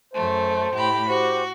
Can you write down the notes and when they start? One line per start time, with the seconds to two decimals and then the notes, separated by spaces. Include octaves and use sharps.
0.13 F#2 A3 C5
0.73 A2 G4 B5
1.09 F#4 G4 C5